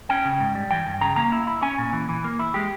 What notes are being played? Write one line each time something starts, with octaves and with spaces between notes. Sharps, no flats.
C#4 G5
C#3
G#2
G3
E3 G5
G2
C#3 A#5
A#3 A#5
E4
E4
C#4 G#5
A#2
E3
E3
A#3
E4
G#3 G4